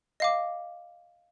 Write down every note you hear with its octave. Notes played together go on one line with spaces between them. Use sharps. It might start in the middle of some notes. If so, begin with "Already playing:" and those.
D#5 F5 D6